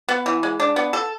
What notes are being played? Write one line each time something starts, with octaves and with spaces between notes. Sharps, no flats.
B3
E3
G#3
D4
B3
A4